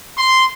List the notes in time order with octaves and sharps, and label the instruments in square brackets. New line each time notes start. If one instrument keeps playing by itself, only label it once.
[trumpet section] C6